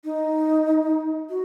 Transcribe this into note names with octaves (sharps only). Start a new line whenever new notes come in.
D#4
F#4